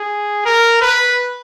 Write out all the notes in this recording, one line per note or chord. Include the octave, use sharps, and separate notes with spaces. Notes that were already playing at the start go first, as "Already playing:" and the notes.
Already playing: G#4
A#4
B4